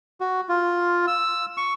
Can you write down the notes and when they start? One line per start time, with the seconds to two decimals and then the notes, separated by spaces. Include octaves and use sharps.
0.20 F#4
0.49 F4
1.08 E6
1.57 C#6